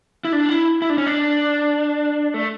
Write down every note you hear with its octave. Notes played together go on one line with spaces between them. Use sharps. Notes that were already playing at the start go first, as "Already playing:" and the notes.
E4
D4
E4
E4
D4
C#4
D4
A3